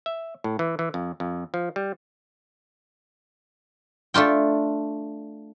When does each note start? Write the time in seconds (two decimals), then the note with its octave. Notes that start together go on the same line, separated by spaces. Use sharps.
0.06 E5
0.44 A2
0.59 E3
0.79 E3
0.94 F2
1.20 F2
1.54 F3
1.76 G3
4.14 A3 D4 F4 G5